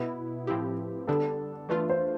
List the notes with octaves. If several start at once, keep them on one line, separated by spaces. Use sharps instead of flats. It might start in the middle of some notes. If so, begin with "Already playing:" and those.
Already playing: B2 B3 E4 B4
A2 F3 C4 E4 G4
D3 G3 B3 D4 A4
E3 A3 D4 F4 B4
C5